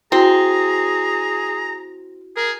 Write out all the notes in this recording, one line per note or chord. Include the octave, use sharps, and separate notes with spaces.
C4 E4 F#4 G#4 A#5
G#4 A#4